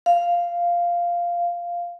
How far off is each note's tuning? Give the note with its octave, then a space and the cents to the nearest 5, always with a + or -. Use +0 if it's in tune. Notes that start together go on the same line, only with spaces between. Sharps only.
F5 -5